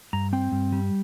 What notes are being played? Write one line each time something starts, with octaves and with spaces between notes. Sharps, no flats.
G2 A#5
C4 G5
G2
G3